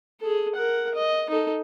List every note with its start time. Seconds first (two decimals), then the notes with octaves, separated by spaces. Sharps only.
0.20 G#4 A4
0.55 A#4 F#5
0.95 D#5
1.30 D#4 A4